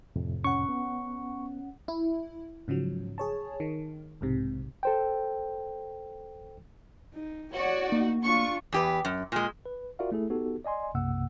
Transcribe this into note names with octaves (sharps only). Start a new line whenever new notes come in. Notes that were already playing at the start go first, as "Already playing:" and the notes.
F2 A2 C3
C#4 F#5 C#6
B3
E4
G#2 C#3 F3 F#3
G#4 C#5 A5
D#3
B1 G#2 C3
A4 C5 G5
D#4
F#4 C#5 D5
A#3 D#4
D4 F4 C#6
E2 G4 B4
F#2
A#2 G#3
B4
F4 F#4 A#4 D5 E5 F5
A3 E4 G#4 A4
B3 D#4 F#4 G4 A4
D5 D#5 G#5 C6
B1 F#2 C3 A#3 F#5 E6